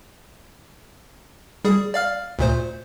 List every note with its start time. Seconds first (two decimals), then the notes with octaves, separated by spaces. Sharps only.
1.65 G3 G#4
1.94 D5 F5 F6
2.39 D2 A#2 C5